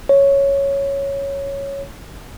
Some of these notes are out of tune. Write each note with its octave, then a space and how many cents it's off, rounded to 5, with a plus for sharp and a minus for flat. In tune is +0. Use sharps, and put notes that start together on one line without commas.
C#5 +0